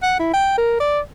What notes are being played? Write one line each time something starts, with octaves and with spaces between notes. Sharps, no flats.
F#5
E4
G5
A#4
D5